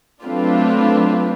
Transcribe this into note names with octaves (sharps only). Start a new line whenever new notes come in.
F#3 A3 C4 D4 F4 B4